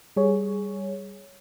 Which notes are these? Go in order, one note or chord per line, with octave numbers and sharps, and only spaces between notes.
G3 G#4 C#5